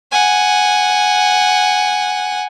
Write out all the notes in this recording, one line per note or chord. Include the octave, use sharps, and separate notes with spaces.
F#5 G#5